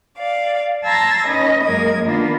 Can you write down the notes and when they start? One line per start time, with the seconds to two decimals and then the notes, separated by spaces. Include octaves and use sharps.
0.18 D5 F5
0.84 A5 A#5 C6 E6 G#6 A#6
1.27 C#4 D#4 B4 D#5
1.62 F#2 G#3 A#3 A#4 D#5 G#6
2.05 D#3 A#3 B3 D4 F4